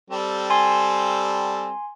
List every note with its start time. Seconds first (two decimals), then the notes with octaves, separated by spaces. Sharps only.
0.10 G3 C4 A4
0.50 G#5 C6